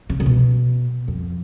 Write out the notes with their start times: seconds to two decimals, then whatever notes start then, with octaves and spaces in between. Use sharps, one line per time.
0.10 C#3
0.20 C#3
0.26 B2
1.08 F2